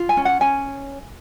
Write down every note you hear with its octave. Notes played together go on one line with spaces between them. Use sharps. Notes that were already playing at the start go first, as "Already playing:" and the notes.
Already playing: F4
G#5
C#4
F#5
C#4 G#5